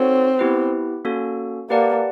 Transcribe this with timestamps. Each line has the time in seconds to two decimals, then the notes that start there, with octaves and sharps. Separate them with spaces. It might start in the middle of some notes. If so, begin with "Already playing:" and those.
Already playing: C4 D#4 F#4 A4 C#5 F#5
0.39 B3 E4 G4 B4
1.05 A#3 C#4 F#4 A4
1.70 A#3 G4 B4 D5 F#5 A5